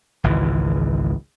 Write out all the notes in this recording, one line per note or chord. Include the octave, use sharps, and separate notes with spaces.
G#1 C#2 E3